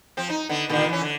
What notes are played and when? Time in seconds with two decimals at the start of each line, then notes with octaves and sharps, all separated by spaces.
0.17 F3 C4
0.30 D#4
0.49 D3 B3
0.69 A#2 D3 D#3
0.89 E3 C#4
1.01 D3